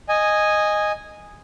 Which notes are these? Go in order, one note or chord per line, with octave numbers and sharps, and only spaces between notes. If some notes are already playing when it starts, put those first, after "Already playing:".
D#5 G#5